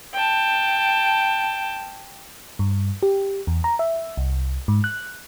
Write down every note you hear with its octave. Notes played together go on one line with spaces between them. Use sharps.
G5 A5
G2
G4
E2
A#5
E5
C2
G#2
F#6